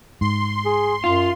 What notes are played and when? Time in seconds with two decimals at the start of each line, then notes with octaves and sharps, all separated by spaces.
0.21 G#2 C6
0.65 G#4
1.04 F#2 F4